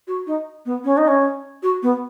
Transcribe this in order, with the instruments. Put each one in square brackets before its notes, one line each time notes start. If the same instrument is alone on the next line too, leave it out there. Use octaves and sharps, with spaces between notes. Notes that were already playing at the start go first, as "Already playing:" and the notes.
[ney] F#4
D#4
B3
C#4
D#4
C#4
F#4
B3